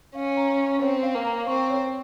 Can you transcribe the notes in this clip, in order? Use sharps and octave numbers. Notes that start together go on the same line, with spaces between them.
C#4 F5
A#5
C#6
C4 C#5
F5
A#3
A#5
C4 C#6
C#5